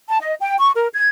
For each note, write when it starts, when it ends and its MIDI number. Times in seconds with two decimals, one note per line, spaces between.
0.09 0.20 81
0.20 0.33 75
0.40 0.55 79
0.59 0.71 85
0.75 0.88 70
0.94 1.09 92